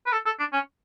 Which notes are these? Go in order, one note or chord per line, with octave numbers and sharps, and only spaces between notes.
B4
A4
A4
D4
C#4